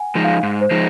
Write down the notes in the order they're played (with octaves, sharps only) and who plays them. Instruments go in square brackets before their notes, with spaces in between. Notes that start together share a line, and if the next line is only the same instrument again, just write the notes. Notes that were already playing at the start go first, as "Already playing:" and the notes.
Already playing: [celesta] F#5 G#5
[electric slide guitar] F3 G#3 D#4
[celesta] F5
[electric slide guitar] G#2
[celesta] C5
[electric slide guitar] F3 G#3 D#4